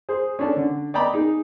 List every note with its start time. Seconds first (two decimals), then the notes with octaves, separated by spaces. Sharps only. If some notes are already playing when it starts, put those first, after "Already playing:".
0.09 G#4 C5
0.39 C#4 D4 A4
0.57 D3
0.94 D5 D#5 G5 A#5 B5 D6
1.14 D#4 G#4